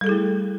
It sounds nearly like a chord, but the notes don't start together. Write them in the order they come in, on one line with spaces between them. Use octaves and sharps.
G3 A4 G#4 E4 A3